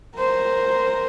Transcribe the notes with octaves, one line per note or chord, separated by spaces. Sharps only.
A#4 C5